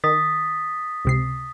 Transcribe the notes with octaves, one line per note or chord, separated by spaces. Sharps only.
D#3 D#6 A6 B6
C#2 C3 C7